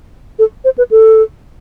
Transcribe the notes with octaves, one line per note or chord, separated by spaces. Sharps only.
A4
C5
B4
A4